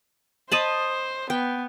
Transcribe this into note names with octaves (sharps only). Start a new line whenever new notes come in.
C5 D#5 A5 B5
B3 G5